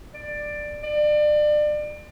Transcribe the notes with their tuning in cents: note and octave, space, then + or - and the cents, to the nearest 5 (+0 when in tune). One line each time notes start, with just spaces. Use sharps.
D5 +10
D5 +30